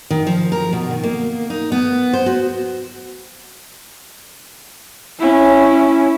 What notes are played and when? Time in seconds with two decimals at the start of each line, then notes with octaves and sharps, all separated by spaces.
0.10 D#3
0.27 F3
0.52 A#4
0.73 B2
0.91 D#3
1.03 A#3
1.50 D#4
1.72 B3
2.13 C5
2.26 F#4
5.19 C#4 E4